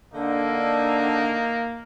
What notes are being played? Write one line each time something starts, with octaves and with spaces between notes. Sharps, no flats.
D3 A#3 D#4